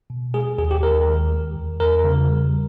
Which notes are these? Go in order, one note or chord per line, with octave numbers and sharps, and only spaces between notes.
B2
G#3 G#4
D#2 G#4
G4
D#2 A#4
D#3
G#3
E2
E2 A#4
C#3
G3